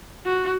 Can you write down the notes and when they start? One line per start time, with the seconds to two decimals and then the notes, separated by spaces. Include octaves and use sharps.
0.25 F#4